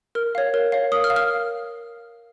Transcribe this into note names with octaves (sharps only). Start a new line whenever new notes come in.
A#4 F6
C#5 F5
A#4
C#5 F5
A#4 D#6
F6
F5
F6